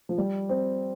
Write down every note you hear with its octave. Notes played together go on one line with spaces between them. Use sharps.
F3
G3
C4